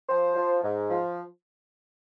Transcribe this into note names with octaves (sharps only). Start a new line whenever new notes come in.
F3 C5
F3
G#2
F3